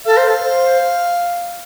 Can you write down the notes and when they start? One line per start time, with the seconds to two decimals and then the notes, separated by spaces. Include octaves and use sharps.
0.06 A4 F5
0.17 C5
0.28 A4
0.44 C5